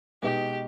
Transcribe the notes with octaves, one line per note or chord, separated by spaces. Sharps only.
B2 G#3 B3 D#4 G4